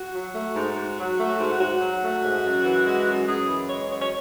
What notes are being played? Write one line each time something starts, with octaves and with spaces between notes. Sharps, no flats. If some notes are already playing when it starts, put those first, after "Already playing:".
Already playing: F#4
F#3
A3
G#2
G#2
F#3
A3
G#2
G#2 F#4
F#3
A3
G#2
F#2
E3
G#3
F#2
F#2 G#4
E3
G#3 C#5
F#2 C#5
C#5